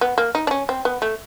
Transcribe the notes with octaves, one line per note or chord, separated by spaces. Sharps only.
B3
A#3
D#4
D4
C#4
C4
B3
A3